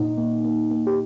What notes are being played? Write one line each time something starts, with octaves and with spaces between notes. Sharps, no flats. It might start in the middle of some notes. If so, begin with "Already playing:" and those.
Already playing: A#2 D#4
A#3
A#3
A#3
G4